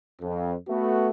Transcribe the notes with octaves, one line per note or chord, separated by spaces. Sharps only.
F2
A3 B3 F#4